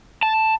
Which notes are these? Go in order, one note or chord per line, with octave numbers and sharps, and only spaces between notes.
A5